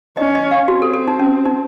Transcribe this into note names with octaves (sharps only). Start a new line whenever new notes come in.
C#4 D#5
D#5
F5
C4 F#4
A4
A4
D#4
C#4
D#4